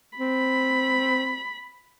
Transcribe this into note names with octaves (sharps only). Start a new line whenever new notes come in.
C4 B5